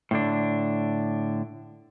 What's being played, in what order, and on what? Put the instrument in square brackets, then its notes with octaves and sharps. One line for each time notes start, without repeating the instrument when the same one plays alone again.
[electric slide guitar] A2 D3 D4